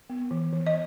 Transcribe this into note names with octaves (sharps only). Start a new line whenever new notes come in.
B3
E3
E3
D#5